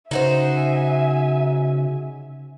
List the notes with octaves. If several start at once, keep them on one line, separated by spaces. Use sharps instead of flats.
C#3 D#4 F#4 C5 E5 G#5